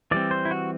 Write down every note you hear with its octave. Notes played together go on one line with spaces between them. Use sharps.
E3 G3 C4 D5
C5
E4
F#4